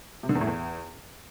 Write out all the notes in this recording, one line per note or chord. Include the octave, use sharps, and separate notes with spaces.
C3
D3
E2
A2
E2